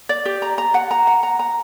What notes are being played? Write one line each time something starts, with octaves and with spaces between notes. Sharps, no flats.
D5
G4
A#5
A#5
F#5
A#5
F#5
A#5
A#5